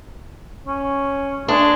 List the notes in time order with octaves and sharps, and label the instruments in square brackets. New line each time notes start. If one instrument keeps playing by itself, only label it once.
[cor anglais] C#4
[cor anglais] G#3 [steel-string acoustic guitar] D4